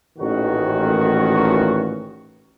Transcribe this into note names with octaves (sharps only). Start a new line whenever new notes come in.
A1 A#2 D#3 F#4